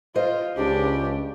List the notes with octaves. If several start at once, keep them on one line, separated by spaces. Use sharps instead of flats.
F4 C5 D#5
C#2 D4 G4